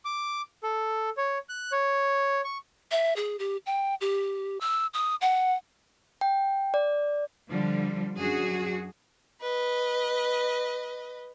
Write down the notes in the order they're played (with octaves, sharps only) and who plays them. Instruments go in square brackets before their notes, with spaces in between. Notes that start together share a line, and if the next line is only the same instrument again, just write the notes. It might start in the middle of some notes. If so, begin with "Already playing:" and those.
[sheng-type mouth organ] D6
A4
C#5
F#6
C#5
C#6
[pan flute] E5
G#4
G4
G5
G4
E6
D#6
F#5
[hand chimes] G5
D5
[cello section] D3 F3 G3
F#2 D4 F#4 G#4
[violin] B4 D#5